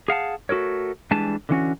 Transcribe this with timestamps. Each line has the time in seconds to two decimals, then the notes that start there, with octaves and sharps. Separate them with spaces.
0.08 G#4 F5 F#5 A5
0.49 A3 F#4 A4 A#4 C#5
1.11 E3 G3 G#3 D4 G#5 A5
1.49 D3 E3 C#4 F#4